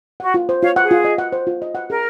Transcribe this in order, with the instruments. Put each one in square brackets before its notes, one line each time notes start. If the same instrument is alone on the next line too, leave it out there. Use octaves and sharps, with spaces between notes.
[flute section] F#4 [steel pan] F#5
[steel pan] F4
C5
[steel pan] F4 [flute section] C#5 F5
[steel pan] F#5
[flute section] G#4
[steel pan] F4
D#5
F#5
C5
F4
D#5
F#5
[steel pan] G#4 [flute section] A#4